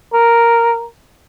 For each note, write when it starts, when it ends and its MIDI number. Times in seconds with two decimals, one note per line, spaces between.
0.13 0.86 70